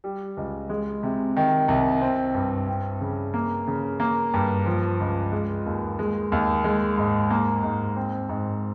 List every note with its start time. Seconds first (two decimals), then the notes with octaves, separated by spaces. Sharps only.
0.04 G3
0.37 C#2
0.70 G#3
1.03 C3
1.36 D#3
1.68 C2
2.02 C4
2.34 G2
2.68 C4
3.01 C#3
3.34 A#3
3.68 C#3
4.00 A#3
4.34 G2
4.66 F3
5.00 C#2
5.32 G#3
5.66 D#2
5.99 G#3
6.32 D#2
6.64 G#3
6.98 G#2
7.30 A#3
7.63 G#2
7.96 C4
8.29 G#2